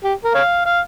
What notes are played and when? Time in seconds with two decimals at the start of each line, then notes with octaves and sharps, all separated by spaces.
0.04 G4
0.24 A#4
0.35 C#5 F5
0.66 F5